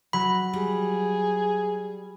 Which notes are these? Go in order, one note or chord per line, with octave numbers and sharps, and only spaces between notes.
F#3 F#4 B5
G3 G#4